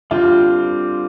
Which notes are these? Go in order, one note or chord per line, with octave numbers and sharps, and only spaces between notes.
D3 G3 C4 F4